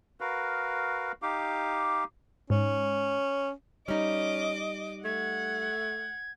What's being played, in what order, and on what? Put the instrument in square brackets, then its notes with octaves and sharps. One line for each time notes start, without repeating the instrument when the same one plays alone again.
[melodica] F#4 A#4 B4 F5
D#4 G4 F5 D6
[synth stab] G#2 [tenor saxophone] C#4
[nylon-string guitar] G3 D#4 [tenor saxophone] C#4 [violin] D#5 D6
[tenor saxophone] A3 [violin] F#5 [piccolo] G#6